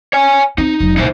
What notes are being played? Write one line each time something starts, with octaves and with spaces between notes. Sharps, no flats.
C#5 G#5
C4 D#4
F1 F#3
C2 A#2 D#4 E4 C5